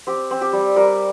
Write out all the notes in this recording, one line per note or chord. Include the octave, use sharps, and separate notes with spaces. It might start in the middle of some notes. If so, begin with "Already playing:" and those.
C4 G4
C4
G4
G3
G3 A#4